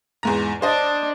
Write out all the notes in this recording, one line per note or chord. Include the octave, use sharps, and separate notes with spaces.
E2 G#2 A#5
D4 C5 D#5